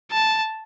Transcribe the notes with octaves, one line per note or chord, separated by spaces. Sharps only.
A5